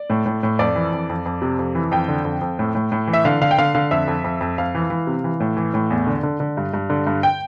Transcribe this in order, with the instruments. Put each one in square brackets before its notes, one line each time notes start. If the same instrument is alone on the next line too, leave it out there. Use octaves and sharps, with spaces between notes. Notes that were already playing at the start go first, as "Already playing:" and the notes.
Already playing: [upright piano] D5
A2
A2
A2
F2 D5
E3
F2
F2
F2
C3
F2
E3
F2 G5
D3
F2
F2
A2
A2
A2
E3
E5
D3 F5
D3 F5
G5
D3 F5
D3 F5
F2 E5
F2
F2
F2
F2 F5
E3
E3
C3
E3
A2
E3
A2
E2
D3
D3
D3
G2
G2
D3
G2
G5